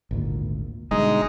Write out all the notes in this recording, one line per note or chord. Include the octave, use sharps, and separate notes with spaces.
G#1 D2 A#2
G1 G2 B2 G#3 D#4